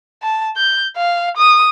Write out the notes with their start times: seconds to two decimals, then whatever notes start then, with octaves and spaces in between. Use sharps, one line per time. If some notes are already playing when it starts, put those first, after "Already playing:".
0.23 A5
0.57 G6
0.97 F5
1.37 D#6